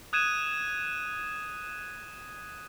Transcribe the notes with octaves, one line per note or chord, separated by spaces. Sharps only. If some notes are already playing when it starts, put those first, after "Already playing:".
D#6 F#6 G#6 D#7 E7